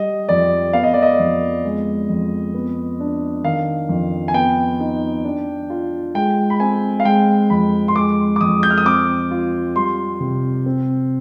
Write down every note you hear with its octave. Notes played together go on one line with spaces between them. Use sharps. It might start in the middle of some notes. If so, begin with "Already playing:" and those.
Already playing: G3 D#5
F2 D5
B3 F5
D#5
D5
D#5
F2
G#3
F2
B3
D4
D#3 F5
F2
G#5
B3 G5
D#4
D4
F4
G#3 G5
B5
C4 G#5
F5
G#3 G5
F2 B5
C6
G#3 D6
D6
F2 D#6
G6
F6
D#6
C4 D6
F4
G3 C6
C3
C4